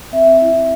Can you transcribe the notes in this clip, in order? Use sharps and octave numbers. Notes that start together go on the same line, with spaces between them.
C4 E5
E4